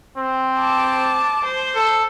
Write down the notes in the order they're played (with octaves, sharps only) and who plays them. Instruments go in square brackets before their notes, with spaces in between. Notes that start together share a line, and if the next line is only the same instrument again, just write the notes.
[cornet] C4
[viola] A5 D6
C5
[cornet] A4